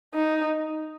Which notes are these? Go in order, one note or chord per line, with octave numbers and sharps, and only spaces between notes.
D#4